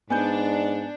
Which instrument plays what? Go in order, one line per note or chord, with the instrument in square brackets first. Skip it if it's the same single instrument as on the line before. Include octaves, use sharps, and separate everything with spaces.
[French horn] G#2 [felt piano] B3 G6 [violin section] D4 [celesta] G#5